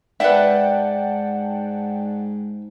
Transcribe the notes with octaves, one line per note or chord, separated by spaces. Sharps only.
G#2 B4 D5 E5 F#5 G5 A5